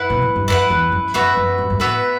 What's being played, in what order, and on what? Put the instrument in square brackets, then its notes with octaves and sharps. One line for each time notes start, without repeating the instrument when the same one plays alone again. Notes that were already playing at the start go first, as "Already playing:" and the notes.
Already playing: [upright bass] F#2 [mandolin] E4 B4 F#5
[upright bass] B2
A2
G2
[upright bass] F#2 [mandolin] E4 B4 F#5
[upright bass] E2
F#2
[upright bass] F#2 [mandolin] B3 F#4 B4 E5
[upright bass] F#2
G2
G2
[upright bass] A2 [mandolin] B3 F#4 B4 E5